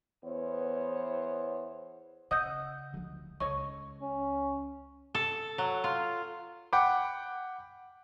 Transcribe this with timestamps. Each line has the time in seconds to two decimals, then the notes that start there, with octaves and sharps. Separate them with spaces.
0.23 E2 B3 C5 C#5
2.31 C#3 D#5 F#5 D#6 E6 G6
2.94 D2 F3
3.40 C#2 A4 C#5 D#5 C#6
4.02 C#4
5.15 A4
5.58 F#3
5.84 F4
6.73 F#5 G5 B5 D6